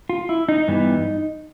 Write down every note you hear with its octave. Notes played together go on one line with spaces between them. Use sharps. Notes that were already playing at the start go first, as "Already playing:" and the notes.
F4
E4
D#4
G2 E3 G3 B3